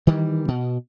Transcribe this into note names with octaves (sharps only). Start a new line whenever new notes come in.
D#3 E3 G3
B2